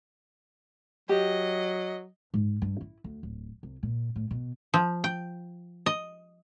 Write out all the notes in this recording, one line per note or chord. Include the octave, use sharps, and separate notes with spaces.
F#3 G4 D#5
G#2
G2
E4
D2
D1
C2
A#2
A2
B2
F3
G5
D#5